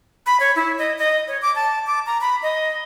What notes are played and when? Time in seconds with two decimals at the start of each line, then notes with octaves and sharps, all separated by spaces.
0.26 B5
0.40 C#5
0.56 E4
0.78 D#5
0.98 D#5
1.28 C#5
1.42 D6
1.56 A5
1.87 D6
2.06 A#5
2.21 B5
2.43 D#5